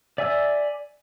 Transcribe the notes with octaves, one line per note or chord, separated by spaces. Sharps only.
D5 E5 G#5 E6